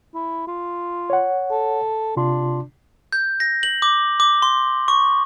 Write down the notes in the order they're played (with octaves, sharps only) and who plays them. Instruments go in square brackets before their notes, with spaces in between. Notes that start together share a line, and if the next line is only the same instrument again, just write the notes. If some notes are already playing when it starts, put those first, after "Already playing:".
[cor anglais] E4
F4
[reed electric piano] C#5 F#5
[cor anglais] A4
[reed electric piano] C3 F4 C6 [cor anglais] D4
[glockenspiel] G6
A#6
F#7
D6
D6
C6
C#6